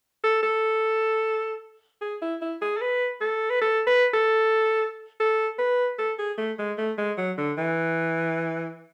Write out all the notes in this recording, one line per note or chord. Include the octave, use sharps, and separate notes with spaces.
A4
A4
G#4
E4
E4
G#4
A4
B4
A4
B4
A4
B4
A4
A4
B4
A4
G#4
A3
G#3
A3
G#3
F#3
D3
E3